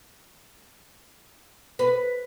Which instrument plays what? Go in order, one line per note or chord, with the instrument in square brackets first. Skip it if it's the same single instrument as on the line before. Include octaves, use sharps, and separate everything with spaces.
[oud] B4